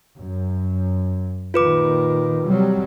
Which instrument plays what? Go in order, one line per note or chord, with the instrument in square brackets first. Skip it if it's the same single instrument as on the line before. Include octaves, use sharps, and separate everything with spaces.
[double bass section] F#2
[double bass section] A#2 D#3 [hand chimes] F4 B4 D6
[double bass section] C3 F#3 G3